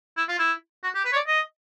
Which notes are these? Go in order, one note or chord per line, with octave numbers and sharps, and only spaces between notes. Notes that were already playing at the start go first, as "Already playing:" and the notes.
E4
F4
E4
F#4
G4
B4
C#5
D5
D#5